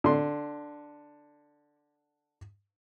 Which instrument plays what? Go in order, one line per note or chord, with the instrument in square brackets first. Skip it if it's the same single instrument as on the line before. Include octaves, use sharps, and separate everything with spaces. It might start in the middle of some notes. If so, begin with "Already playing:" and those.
[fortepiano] D3 C6